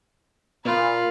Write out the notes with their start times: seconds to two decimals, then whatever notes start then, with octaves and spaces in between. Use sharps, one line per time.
0.65 A#2 F4 B5